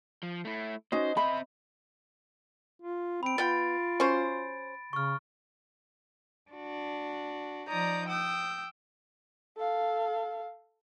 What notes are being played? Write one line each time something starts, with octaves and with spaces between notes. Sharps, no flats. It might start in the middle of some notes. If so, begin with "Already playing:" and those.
F3
A3 E4
C#4 D#4 F#4 C5 D#5
C4 E5 B5
F4
C4 B5 D7
B3 F4 G5 A6
C#4 F#4 C5
C#3 C#6 F6
D4 F#4
F3 D#4 D5 A#5 D#6 G6
G5 D#6 E6 G6
A4 F5